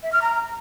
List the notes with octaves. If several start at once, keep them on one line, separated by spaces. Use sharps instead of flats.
E5
F6
A#5